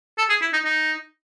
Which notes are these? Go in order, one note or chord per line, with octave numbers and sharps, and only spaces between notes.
A4
G#4
E4
D#4
D#4